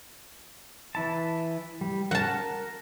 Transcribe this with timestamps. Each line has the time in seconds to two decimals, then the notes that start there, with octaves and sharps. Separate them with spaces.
0.95 E3 E4 A5
1.81 G3
2.11 A#4 F#5 A5